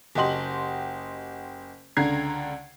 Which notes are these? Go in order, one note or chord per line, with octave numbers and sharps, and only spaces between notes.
F#1 F#4 G4 D#5 C6 F#7
C#2 D3 A#5 G#6 C7